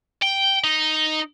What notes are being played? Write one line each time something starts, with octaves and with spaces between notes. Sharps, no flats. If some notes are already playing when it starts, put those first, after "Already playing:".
G5
D#4